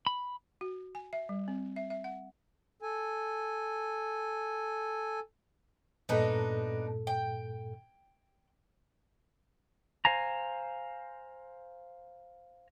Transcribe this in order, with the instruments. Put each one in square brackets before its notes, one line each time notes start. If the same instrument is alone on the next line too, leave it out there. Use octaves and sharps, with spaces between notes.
[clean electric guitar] B5
[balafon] F#4
G#5
E5
G3
C4
E5
E5
F#5
[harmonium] A4 G#5
[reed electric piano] G2 A#2 A4 [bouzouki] B3 D4 D#4
[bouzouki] G5
[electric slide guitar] C5 F5 G#5 A#5